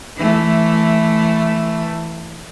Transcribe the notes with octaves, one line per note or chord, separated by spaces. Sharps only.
E3 A3